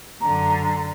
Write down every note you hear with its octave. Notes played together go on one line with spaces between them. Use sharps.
F#2 D3 A#5